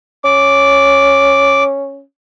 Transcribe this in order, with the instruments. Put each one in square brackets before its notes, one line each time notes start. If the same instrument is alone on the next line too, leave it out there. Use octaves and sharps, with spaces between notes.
[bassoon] C#4 [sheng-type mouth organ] D6